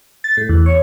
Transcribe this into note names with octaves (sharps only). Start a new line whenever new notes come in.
A6
A2
E2
C#5